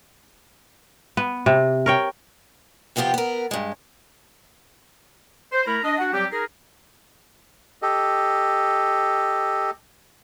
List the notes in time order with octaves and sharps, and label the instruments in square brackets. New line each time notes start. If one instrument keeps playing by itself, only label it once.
[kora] B3
C3
A#4 C#5 G5
[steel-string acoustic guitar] C3 F3 B3 F4 G4
B3 A#4
G2 G#3
[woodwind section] C5
A3 E4 A#4 A#5 B5
D4 D#5
D4 F#4 F#5
F#3 G3 C4 G4
D#4 G#4 A#4
[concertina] G4 A4 D#5